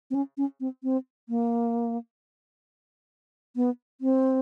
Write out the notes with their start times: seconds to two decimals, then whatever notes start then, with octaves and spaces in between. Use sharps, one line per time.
0.11 C4
0.15 C#4
0.37 C#4
0.60 C4
0.83 C4
1.29 A#3
3.56 B3
4.01 C4